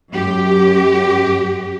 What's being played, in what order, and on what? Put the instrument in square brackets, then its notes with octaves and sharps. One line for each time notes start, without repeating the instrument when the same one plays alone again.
[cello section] F#2 G4